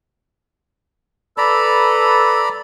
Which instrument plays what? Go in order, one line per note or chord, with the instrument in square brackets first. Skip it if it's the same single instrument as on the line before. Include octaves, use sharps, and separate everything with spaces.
[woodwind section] A4 B4 E6 [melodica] D5 A#5 B5